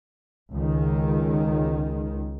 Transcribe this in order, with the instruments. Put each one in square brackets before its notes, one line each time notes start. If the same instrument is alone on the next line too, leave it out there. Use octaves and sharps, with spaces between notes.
[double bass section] C#2 D#3